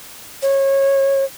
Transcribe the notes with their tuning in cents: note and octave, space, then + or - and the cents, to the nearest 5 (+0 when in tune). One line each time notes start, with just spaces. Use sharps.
C#5 -25